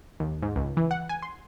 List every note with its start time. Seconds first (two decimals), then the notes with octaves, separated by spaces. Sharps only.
0.20 D#2
0.42 G#2
0.56 C#2
0.77 E3
0.91 F#5
1.09 G#5
1.22 C6